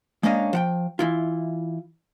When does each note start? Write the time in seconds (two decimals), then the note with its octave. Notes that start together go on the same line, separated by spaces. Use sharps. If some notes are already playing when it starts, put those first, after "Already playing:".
0.23 G#3 A#3 C#4 D4 D#5 F5
0.53 F3 F#5 G5
0.99 E3 E4 F4